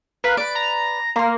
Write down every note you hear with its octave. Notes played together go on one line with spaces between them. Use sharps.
A#4 B4 F5
B4 D5 D7
A#5
A#3 A#5 C6